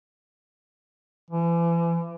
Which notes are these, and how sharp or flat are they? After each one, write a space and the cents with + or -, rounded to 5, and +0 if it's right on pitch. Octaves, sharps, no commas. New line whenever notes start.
E3 +40